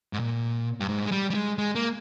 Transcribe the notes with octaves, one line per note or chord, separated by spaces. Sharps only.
G#2
A#2
G2
G#2
G#3
G3
G3
G#3
G#3
A#3